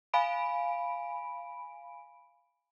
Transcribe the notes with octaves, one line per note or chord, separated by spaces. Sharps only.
F5 G#5 B5 D7